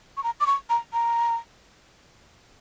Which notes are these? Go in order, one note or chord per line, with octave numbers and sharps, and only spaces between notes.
C#6
A#5
D6
C#6
A#5
A#5